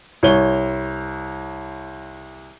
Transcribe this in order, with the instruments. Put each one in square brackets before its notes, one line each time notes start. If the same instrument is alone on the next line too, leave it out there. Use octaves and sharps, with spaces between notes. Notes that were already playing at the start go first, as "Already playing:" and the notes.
[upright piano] C2 C#5 G7